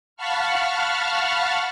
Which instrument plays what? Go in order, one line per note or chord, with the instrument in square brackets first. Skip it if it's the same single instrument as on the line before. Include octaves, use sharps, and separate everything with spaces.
[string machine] F5 F#5 A5 B5 C#6 F6